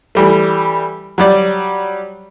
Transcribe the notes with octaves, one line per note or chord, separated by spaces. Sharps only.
E3 G3 A3
F#3 G3 D5